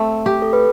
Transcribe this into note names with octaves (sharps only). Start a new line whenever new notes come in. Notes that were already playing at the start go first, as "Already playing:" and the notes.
Already playing: A3 C4
G4
A4
B4